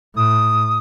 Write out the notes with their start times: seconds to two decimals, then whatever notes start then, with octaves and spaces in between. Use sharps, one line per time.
0.16 A2 D#6